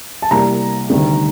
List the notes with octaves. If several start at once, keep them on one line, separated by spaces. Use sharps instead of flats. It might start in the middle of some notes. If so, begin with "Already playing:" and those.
A5
C2 C3 G3 A#3 A#5
D2 C3 D#3 G3